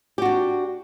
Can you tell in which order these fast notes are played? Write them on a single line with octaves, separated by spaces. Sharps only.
G4 F#4 D4